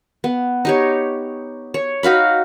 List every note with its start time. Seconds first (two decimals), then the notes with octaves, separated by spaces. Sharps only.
0.24 B3
0.65 D#4 G4 C#5
1.74 C#5
2.03 D#4 F#4 F5 B5